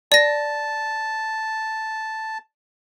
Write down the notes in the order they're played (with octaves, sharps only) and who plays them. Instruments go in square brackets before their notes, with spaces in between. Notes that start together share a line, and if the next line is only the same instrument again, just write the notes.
[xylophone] D5 A#6 [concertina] A5